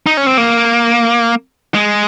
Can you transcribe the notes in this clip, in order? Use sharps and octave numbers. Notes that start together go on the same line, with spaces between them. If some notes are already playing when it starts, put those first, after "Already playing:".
D#4
C#4
C4
A#3
G#3